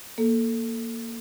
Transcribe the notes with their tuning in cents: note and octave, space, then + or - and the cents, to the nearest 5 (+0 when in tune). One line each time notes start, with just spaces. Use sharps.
A#3 +0 A4 +0